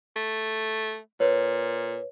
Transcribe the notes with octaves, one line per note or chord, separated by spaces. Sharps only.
A3
A#2 B4 C#5